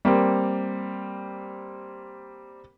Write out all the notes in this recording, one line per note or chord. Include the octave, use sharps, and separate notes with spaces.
G3 A#3 C4